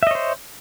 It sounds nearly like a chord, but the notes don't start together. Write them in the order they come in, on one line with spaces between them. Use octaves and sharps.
E5 D#5 C#5 C5